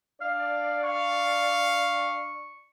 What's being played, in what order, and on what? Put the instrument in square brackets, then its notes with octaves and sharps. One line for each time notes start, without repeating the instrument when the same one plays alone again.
[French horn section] D4 D5 [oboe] F5
[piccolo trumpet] F5 [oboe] C#6